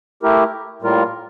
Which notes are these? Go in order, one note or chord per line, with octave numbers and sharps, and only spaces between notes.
A3 E4 G4 A#4
A2 G3 A#3 F4 A#4